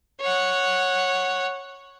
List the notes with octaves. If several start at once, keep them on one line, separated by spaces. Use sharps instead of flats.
C#5 F#5